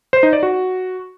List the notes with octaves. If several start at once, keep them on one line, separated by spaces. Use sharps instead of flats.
C5
D#4
D5
F#4